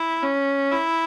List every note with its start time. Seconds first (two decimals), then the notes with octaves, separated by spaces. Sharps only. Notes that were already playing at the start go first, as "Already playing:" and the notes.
Already playing: E4
0.23 C#4
0.72 E4